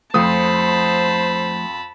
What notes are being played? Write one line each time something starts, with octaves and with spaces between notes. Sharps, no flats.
F2 F3 A3 C5 A5 B5 D#6